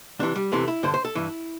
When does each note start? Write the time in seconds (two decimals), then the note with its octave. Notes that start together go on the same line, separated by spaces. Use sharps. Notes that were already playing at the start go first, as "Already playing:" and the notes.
0.19 C2 C3 E3 D4
0.36 G3
0.52 E2 C3 E3 A3
0.68 E4
0.83 G2 D3 C5
0.94 C5
1.05 A4
1.15 G2 E3 E4